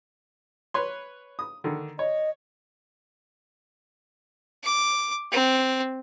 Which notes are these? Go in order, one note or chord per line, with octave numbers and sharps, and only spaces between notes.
B4 C#5 C6
D#6
D3 D#3
C#5 D#5
D6
C4